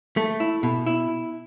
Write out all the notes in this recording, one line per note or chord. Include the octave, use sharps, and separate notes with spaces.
A3
E4
B2
E4